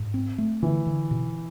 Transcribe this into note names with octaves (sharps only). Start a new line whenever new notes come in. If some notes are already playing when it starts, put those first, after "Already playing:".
Already playing: G#2
C4
A3
D3 E3
D3
B2